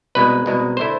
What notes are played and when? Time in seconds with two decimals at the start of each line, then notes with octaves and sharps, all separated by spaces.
0.15 C2 B2 G#3 B4
0.46 C2 B2 G#3
0.77 D3 A3 E4 C5